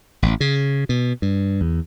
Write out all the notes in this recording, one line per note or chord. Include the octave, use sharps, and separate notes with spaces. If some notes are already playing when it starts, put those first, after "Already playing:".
A1
C#3
B2
G2
E2